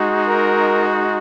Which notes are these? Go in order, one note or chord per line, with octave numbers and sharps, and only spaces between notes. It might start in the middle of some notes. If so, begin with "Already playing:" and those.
Already playing: G#3 D#4 F#4
A#4